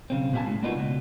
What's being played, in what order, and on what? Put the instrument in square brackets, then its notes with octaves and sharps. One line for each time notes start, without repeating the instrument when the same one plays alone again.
[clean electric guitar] B1 C#3 C4
A#2 B3 G4 F5 G#5 A5
A2 G#3
A#3 B3 D4 D#4 F4 F#4
C#2 B2